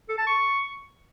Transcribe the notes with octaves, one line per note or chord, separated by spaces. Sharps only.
A4
A5
C#6